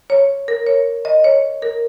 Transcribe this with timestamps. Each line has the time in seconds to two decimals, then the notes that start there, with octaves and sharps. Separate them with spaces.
0.10 C#5
0.48 A#4
0.67 C#5
1.05 D#5
1.24 C#5
1.62 A#4